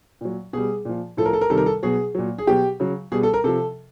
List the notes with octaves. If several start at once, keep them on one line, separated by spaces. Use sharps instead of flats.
A#2 F#3
B2 G3 G#4
A#2 F3
A2 F3 A4
A#4
A4
A#4
C3 D#3 G3 A4
A#4
A4
B2 F#3 G#4
A#2 F#3
G#4
B2 F#3 G4
C#3 F#3
B2 G3 G#4
A4
A#4
C3 F3 A4